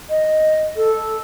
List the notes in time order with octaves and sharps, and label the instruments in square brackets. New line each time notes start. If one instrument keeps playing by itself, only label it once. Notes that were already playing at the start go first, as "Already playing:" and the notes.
[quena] D#5
A4